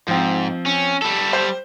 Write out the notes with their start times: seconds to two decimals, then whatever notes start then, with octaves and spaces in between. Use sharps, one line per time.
0.08 G#2 F3 C4
0.66 C#4
1.02 G3 A4
1.33 C5